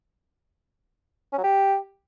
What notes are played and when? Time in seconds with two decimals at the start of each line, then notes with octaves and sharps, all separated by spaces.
1.33 C#4
1.38 F#3
1.44 G4